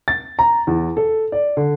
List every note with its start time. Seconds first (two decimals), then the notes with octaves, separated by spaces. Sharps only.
0.08 A6
0.39 A#5
0.67 E2
0.97 A4
1.32 D5
1.57 D3